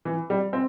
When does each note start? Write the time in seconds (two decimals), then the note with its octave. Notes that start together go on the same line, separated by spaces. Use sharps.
0.05 E3
0.30 G3
0.53 C4